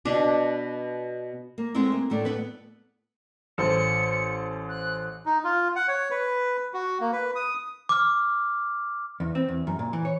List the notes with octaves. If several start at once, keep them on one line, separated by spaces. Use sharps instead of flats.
B2 D4
A#3
G#3 A3 B3 C4 E4
A#3
A2 G3 A3 D4
A3 B3 B4
A1 A4 C5 C#7
F#6
D#4
F4
F#5
C#5
B4
F#4
A#3
B4
D#6
D6 F6
E2
C4
E2
F#2
A#2
E3
C#5